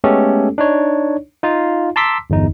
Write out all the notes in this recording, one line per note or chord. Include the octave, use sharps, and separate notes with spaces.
G#3 A3 B3 C#4 G4 A4
D4 D#4 C#5
D#4 F4 F5
A5 A#5 C6 D6 E6 B6
G1 E2 D#4